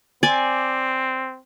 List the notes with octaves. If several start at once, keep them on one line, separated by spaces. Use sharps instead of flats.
C4 D5 G#5